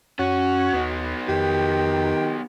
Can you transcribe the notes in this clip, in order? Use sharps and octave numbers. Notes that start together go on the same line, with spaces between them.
F#2 C#4 F#4
D#2 B3 D#4
F2 D#3 G4